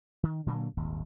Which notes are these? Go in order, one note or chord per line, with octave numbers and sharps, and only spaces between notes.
D#3
A#2 D3 F#3 A#3
D#1 G#1 D#2